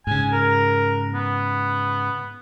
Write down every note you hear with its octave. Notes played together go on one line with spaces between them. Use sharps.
G#2 C#3 G#5
A#4
B3